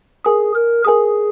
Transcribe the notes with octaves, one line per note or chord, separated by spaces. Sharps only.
G#4 A#4 G#5 D#6
A#4
G#4 A#4 G#5 D#6